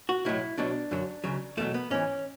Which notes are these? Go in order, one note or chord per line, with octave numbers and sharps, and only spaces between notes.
F#4
B1 A2 F#3 E4
B1 B2 F#3 D4
F#2 D3 F#3
C#2 C#3 F#3
E2 B2 F#3 A3
B3
G#2 E3 C#4